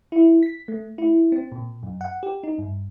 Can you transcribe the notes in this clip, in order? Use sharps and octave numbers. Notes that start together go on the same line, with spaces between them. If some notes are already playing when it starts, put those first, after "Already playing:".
E4
B6
A3
E4
C4
A#2
F#2
F#5
G4
D#4
G2